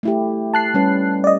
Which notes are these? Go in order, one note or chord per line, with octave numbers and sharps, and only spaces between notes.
A3 E4 G4
A5 F#6 C7
G3 C#4 B4
D5 D#5